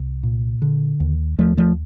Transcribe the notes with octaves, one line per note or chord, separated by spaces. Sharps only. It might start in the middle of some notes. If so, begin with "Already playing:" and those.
Already playing: C2
A#2
D3
D#2
D#2 F3 A3
F3 A3